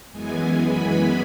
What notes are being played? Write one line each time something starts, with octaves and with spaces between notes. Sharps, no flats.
F#2 E3 G#3 B3 G#5
B5